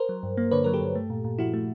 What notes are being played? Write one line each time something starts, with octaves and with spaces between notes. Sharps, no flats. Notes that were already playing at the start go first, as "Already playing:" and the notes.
Already playing: A#4 C5
F#3
G2
A#3
D3 B4 C#5
F#3 A#4
G4 A4
G2
A3
A#2
A#2
F3 E4 F#4
A3